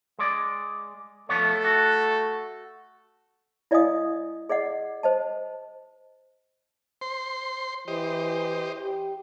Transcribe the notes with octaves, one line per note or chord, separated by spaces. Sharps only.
G#3 D5
F3 A3 B3 A4 C#5
F#4
E4 D5 D#5 F5 G#5 D#6
G#4 D5 D#5 F#5
C5 D#5 A5
C5 C6
E3 G4 C5 D#5
G4